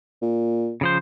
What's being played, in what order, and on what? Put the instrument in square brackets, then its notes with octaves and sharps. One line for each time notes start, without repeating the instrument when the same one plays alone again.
[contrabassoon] A#2
[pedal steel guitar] C#3 F3 C5